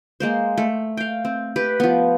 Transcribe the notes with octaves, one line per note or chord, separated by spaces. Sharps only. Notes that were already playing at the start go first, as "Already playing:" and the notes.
G#3 A#3 C5
A3
F5 G5
C4
G4 B4
F3 B3